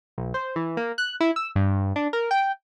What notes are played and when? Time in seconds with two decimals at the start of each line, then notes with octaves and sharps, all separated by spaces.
0.18 B1
0.34 C5
0.56 E3
0.77 A#3
0.98 F#6
1.20 E4
1.36 E6
1.55 G2
1.96 D4
2.13 A#4
2.31 G5